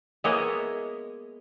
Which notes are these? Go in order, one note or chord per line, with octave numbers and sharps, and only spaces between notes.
G#3 A#3 B3 E4 C#5 D#5